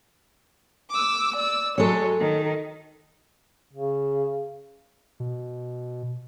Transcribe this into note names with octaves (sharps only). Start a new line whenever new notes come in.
D6 E6
D5 E6
F#3 G#3 A4 C#5
D#3
C#3
B2